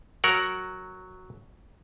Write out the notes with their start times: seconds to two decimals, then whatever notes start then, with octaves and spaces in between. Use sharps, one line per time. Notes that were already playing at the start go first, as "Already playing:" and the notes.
0.24 F#3 A#4 F#5